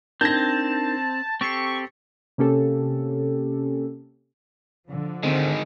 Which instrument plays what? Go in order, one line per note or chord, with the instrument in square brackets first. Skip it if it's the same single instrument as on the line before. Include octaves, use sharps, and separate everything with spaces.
[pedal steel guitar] C4 [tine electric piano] D4 D#4 A#4 [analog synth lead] A5 [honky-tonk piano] G6 G#6 A#6
[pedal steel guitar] C4 G4 A4 [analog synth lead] C#6 [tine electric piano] A6 C7
[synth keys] C3 A#3 C#4 G4 A4
[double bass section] D3 F3
[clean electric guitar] D2 C4 [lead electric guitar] D#3 G#3